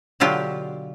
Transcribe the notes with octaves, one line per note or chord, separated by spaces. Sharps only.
B2 D3 F#3 F4 G4